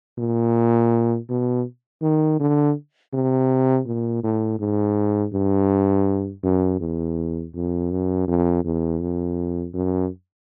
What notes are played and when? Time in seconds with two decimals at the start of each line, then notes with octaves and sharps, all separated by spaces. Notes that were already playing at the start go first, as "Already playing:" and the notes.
0.18 A#2
1.30 B2
2.02 D#3
2.40 D3
3.13 C3
3.86 A#2
4.24 A2
4.60 G#2
5.33 G2
6.43 F#2
6.80 E2
7.55 F2
7.91 F#2
8.28 F2
8.64 E2
9.01 F2
9.74 F#2